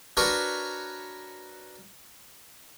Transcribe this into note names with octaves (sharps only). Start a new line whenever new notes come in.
D4 F#4 A#4 B4 C#5 D5